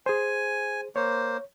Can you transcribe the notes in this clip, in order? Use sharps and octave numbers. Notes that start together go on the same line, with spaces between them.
G#4 C5 G#5
A#3 C5 C#5